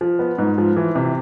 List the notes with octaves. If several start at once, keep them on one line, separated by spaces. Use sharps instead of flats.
F3
B3
G#2
F3
E3
C3